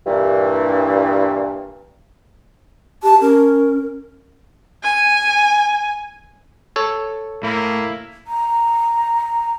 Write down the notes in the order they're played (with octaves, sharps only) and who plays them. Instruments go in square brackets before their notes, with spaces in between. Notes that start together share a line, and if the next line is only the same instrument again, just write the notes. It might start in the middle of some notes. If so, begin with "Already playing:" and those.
[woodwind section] G2 A#2 E3
[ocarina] G4 [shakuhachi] A5
[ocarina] C#4 [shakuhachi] A#4
[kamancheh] G#5
[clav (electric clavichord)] A4 C#5
[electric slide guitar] A2 [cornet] A#3 [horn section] E4
[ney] A#5